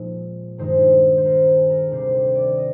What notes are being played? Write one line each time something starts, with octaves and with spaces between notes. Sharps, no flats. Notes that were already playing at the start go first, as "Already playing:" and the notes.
Already playing: A#2 F3 G#3 D#4
G2 D#3 G#3 D#4 C5
C5
A#4
G#4
A#4
D2 C3 D#3 G3 C4 C5
C5
D5
D#5